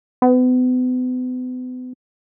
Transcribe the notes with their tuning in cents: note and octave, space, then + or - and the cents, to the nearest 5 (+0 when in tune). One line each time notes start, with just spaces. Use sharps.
B3 +40